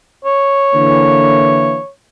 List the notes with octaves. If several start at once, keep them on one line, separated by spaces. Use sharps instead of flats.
C#5
D3 E3 A#3